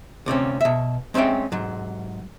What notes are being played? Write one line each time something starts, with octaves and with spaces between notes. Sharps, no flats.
D2 C3 C4 C#4
B2 E5
G#3 C4 C#4 E5 G5
G#2 F#3